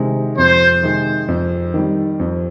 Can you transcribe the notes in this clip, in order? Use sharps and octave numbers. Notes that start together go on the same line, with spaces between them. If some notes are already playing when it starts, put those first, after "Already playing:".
Already playing: C3 D#3 G#3
F2 C5
C3 D#3 G#3
F2
D#3 G3
F2